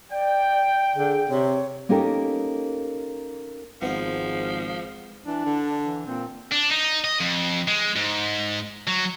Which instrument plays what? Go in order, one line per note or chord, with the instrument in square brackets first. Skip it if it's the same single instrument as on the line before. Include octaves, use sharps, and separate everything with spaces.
[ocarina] D5 [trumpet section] G5
[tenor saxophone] D3 [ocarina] G#4
[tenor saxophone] C3 [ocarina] C#5
[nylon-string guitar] A#3 C#4 D#4 G4 A4 A#4
[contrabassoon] G#1 [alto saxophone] F3 [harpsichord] G#3 B3
[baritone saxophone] E3 [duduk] D4
[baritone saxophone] D3
[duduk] E3
[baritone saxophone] A#2 [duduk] C4
[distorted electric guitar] D4
D#4
D#5
F2
G#3
G#2
F#3